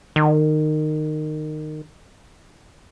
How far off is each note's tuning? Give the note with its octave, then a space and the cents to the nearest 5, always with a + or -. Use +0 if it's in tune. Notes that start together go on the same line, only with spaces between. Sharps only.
D#3 -20